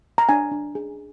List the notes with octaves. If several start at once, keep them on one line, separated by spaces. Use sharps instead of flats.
A#5
D4 G#5
D4
G#4